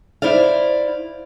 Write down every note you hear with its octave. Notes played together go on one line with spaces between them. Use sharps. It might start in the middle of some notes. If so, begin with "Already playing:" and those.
E4 C5 D5 F5